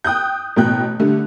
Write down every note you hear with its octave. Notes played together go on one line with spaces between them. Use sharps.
G5 D#6 F#6 G6
A1 B2 G5 F#6
D3 G3 A3